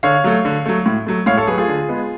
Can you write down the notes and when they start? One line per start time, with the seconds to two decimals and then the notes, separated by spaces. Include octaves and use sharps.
0.03 D3 C#5 F5
0.24 F#3 A3
0.45 D3
0.66 F#3 A3
0.86 A2
1.06 F#3 A3
1.26 A2 C#5 F5
1.37 A4 C#5
1.47 F#3 G#4 B4
1.51 A3
1.58 F4 G#4
1.68 D3
1.89 G#3 B3